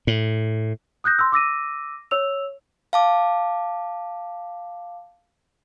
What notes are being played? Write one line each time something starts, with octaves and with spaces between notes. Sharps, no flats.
A2
D#6 F#6 G6 A#6
C6 E6
D6 E6 A#6 D#7
C#5 E6 F7
F5 A5 D6